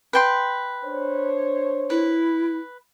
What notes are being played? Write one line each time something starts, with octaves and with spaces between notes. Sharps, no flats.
B4 G5 C6
D4 C5 C#5
E4 B4